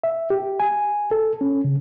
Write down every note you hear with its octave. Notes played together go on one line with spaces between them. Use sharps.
E5
G4
G#5
A4
C#4
C#3